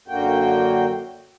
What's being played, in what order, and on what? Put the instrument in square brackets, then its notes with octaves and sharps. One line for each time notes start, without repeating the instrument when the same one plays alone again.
[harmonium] F#2 D3 A#3 F#4 G5